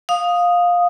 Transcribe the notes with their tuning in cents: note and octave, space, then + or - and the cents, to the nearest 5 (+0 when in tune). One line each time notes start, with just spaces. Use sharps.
F5 +15 D#6 +0